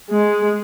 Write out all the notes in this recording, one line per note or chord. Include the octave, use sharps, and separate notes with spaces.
G#3